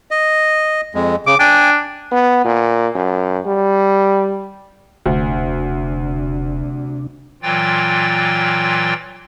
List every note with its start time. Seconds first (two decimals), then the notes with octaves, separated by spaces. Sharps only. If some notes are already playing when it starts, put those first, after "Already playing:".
0.11 D#5
0.95 F2 G#3
1.26 C#3 D6
1.39 D4 G5 G#5
2.12 B3
2.45 A#2
2.95 F#2
3.46 G3
5.06 E1 D2 C3 D4
7.43 A#2 E3 F#3 F4 G5 A6